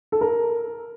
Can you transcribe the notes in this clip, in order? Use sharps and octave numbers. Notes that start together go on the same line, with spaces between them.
A4
A#4